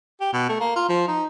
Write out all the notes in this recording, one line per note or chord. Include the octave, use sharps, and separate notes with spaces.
G4
B2
A3
A#3
F4
F3
D#4